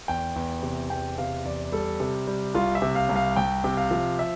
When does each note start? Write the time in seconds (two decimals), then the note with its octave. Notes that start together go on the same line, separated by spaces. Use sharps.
0.08 E2 G5
0.36 E2
0.63 C3
0.90 E2 G5
1.18 C3 F5
1.45 E2 D5
1.72 G3 A4
2.00 C3
2.27 G3
2.55 C2 F4
2.75 E5
2.82 C3
2.95 F5
3.09 C2
3.16 F5
3.36 C2 G5
3.64 C3
3.77 F5
3.91 F3
4.19 E5